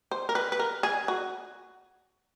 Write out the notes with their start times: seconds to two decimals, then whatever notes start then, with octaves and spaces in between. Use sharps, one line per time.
0.11 C5
0.29 A#4
0.35 B4
0.52 B4
0.60 A#4
0.83 G#4
1.08 F#4